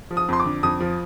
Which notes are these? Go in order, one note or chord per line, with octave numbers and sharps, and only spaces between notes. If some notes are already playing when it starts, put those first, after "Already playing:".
F3
D#6
F2 C6
D6
D3
F2 D#6
F3